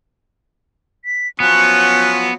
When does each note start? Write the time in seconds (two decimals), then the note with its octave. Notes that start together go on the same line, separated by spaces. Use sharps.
1.05 B6
1.40 F3 F#3 B3 C#4 F#6